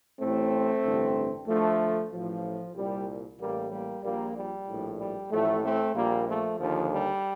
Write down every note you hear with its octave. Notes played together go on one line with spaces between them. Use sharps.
A1 A2 A3 C4
A1 G2 D3
D2 D3 F3 A3
A1 A2 F3
C2 A#2 G3
A1 A2 G3 A#3
G3 A#3
A#1 A#2 G3 A#3
G3
A#1 A2
G3
A1 A2 F3 A3
A3 C4
A#1 A#2 G3 A#3
F3 A3
D#2 D3 F3
G3